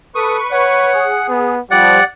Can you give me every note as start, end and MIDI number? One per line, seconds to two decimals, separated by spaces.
0.15 0.40 69
0.15 0.93 71
0.15 0.93 85
0.15 0.37 87
0.52 1.10 73
0.52 1.27 78
0.94 1.56 68
1.29 1.60 59
1.71 2.00 53
1.71 2.00 55
1.71 2.03 67
1.71 2.04 74
1.71 2.04 78